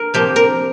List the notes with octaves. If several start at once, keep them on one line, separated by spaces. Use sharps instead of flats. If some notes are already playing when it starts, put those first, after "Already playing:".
Already playing: A#4
C3 F3 A#3 G4
A#4